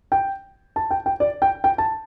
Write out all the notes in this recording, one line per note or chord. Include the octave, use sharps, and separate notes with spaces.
G5
A5
G5
G5
D5
G5
G5
A5